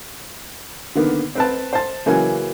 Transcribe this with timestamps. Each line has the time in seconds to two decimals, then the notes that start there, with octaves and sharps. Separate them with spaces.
0.95 D3 D#3 A#3 B3
1.35 C4 B4 A5
1.73 C5 A5
2.06 C#3 E3 F#3 A#3 G#5